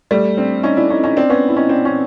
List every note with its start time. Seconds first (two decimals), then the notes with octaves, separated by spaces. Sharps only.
0.11 G3 A3
0.37 C4 D4
0.63 C#4 D#4
0.77 D4 E4
0.90 C#4 D#4
1.04 C#4 D#4
1.17 C4 D4
1.30 B3 C#4
1.49 E4
1.56 C#4 D#4
1.69 C4 D4
1.85 C#4